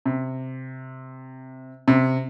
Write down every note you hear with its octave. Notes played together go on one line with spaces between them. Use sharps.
C3
C3